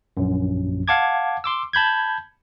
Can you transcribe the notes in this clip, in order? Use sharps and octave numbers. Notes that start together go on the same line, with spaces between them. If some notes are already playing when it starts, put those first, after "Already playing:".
A#1 F#2
F5 F#5 A5 D6 G#6
C6 D6 E6
A5 B5 G6 G#6